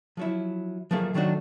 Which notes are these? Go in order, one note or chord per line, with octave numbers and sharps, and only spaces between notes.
F3 F#3 E4
F3 F#3 A3 A#3 G#4
D#3 F#3 G3 A3 D4 F#4